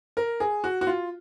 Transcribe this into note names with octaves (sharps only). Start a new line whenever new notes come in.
A#4
G#4
F#4
F#4
F4